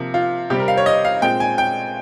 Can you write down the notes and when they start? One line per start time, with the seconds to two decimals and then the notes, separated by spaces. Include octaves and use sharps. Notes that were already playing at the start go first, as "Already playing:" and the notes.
Already playing: C3 F3 A#3
0.14 F4
0.50 C3 G3 C4 G4
0.59 A#4
0.68 F5
0.77 C#5
0.86 D#5
1.05 F5
1.22 A#2 G#3 C4 G5
1.40 G#5
1.58 G5